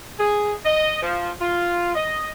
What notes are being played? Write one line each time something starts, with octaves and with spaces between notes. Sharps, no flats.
G#4
D#5
F3
F4
D#5